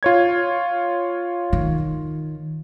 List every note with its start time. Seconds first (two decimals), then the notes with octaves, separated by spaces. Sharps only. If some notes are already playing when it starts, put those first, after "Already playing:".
0.03 F4 C#5 G#6
1.53 D#3